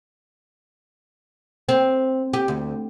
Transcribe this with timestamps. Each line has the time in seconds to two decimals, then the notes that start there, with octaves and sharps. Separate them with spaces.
1.69 C4
2.33 G4
2.48 D2